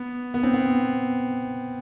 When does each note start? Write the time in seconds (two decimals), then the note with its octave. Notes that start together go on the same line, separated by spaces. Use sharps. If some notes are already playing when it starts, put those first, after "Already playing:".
Already playing: B3
0.34 B3
0.43 C4
0.54 B3